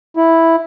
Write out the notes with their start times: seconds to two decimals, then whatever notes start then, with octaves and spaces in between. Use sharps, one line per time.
0.17 E4